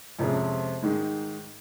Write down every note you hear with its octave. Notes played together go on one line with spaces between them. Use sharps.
F2 C3 F3 G#3 C#4
G#2 D#3 G#3